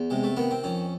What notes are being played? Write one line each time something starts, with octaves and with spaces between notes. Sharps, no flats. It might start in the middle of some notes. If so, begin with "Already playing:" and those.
Already playing: E2
C3 G#3
A3
D#3 B3
C4
F2 C#4